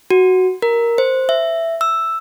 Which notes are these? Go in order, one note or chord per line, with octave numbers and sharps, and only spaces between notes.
F#4
A#4
C5
E5
E6